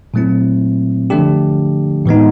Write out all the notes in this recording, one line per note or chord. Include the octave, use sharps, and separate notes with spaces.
A#2 F#3 A3 C4 E4
D3 F3 A3 D4 G4
A2 E3 G#3 B3 D#4